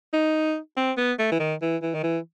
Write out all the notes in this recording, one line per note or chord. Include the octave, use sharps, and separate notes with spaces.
D#4
C4
B3
A3
E3
D#3
E3
E3
D#3
E3